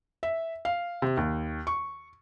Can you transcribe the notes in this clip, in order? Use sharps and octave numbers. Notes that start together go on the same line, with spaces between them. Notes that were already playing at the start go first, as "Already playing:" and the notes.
E5
F5
C3
D#2
C#6